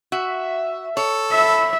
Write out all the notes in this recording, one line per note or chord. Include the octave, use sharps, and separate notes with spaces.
F#4 E5
A4 C#5
E5 B5